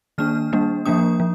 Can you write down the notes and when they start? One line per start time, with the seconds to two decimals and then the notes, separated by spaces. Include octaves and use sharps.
0.18 D#3 A#3 D4 F6
0.52 G3 A#3 D4
0.85 F3 A#3 D4 D#6
1.20 F3